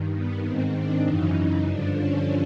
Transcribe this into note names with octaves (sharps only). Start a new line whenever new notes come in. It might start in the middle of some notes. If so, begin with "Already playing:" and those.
Already playing: G2 D#3
B3
G#2 D#3 C4
D4
F#2 C#3 E3 D#4
G2 D3 F3 D4
C#4